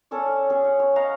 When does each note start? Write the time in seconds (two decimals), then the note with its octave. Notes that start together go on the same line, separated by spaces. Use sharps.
0.11 C#4 A4 C#5 D5
0.50 C#4 G#4
0.64 F#5
0.80 C#5
0.96 D#5 F5 F#5 A#5